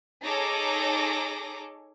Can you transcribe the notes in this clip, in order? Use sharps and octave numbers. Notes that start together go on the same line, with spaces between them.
D#4 G#4 A4 C#5 D6 A#6